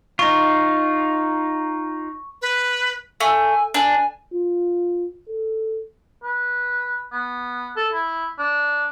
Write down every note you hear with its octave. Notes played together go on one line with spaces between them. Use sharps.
D#4 F4 C#6
B4
A3 G#5
D4 G#5
F4
A4
B4
B3
A4
E4
D4